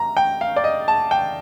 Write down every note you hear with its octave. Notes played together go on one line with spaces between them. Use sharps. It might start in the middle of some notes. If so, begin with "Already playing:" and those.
Already playing: A#5
G5
F5
D5
D#5
A5
G5